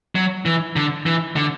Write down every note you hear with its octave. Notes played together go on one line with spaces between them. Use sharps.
F#3
E3
D3
E3
D3